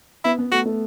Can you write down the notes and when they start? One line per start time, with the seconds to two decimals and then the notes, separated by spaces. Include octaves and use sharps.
0.24 B3 E4
0.38 B3
0.52 A3 F#4
0.65 A3